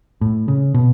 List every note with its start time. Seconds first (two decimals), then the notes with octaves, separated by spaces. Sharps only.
0.21 A2
0.48 C#3
0.74 B2